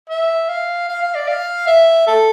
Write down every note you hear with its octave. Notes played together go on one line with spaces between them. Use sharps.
E5
F5
F5
F5
D5
F5
E5
A4